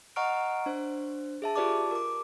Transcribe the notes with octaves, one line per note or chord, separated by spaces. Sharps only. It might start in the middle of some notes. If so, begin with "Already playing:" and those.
D#5 F#5 A#5 C#6 F6 D7
D4 C5
G#4 E5 A5
F4 G4 B4 D5 A5 D6
A#4 D6